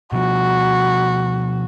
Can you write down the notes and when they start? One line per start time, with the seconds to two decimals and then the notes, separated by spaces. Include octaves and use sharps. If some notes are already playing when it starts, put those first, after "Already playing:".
0.12 B2 F3 F#4